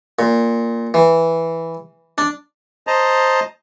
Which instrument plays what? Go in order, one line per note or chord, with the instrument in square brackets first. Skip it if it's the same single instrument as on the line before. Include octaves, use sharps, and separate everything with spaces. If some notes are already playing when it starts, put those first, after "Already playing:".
[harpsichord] A#2
E3
D4
[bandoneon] C5 D#5 A5 A#5